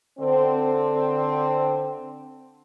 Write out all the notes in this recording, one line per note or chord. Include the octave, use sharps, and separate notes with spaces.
D3 C4